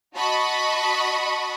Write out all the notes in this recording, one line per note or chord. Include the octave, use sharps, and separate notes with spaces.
F#4 D#5 A5 B5 C#6